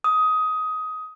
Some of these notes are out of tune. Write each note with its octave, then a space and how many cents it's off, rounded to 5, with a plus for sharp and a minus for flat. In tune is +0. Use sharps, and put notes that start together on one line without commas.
D#6 +15